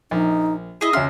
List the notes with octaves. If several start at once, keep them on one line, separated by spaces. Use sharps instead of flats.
A#1 D#4
E4 G#4 D#5 E5
C#2 C#4 E5 C6 F6